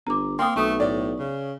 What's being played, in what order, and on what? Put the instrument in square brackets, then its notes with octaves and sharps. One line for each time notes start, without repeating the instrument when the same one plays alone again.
[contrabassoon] G1 [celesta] A#5 D6
[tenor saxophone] A#3 [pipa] C4 [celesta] C6 D#6
[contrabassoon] B1 [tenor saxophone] A3 [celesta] C#6 D#6
[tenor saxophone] A2 [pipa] D5
[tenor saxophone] C#3